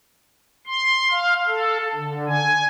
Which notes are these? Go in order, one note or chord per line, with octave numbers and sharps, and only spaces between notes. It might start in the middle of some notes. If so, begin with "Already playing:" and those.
C6
F5
A4
D3
G#5